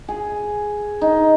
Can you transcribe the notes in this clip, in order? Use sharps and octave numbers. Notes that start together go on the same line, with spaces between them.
G#4
D#4